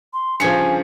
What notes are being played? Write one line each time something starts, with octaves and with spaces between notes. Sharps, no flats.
C6
G2 C#3 F3 G#5 G#6 C#7